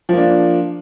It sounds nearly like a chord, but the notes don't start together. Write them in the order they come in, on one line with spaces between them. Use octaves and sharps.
F3 A#3 D4